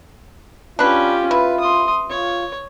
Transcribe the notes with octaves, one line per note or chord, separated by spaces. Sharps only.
C#4 D4 F4 G4 B4
E4 B4
C6 D#6
F4 C#5